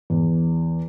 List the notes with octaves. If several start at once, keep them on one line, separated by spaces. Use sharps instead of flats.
E2